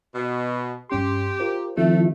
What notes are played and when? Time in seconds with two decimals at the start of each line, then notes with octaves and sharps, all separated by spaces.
0.15 B2
0.90 G2 C#4 G4 C6
1.39 F4 A#4 C5
1.77 D#3 F3 A3 C4 E4